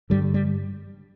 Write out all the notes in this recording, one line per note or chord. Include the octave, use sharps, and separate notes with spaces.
G2 D3 G3
G3